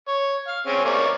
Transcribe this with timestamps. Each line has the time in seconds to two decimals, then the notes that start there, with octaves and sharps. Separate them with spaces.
0.08 C#5
0.48 F5
0.67 C4 C#4 G#4
0.85 A#3 C#5 D5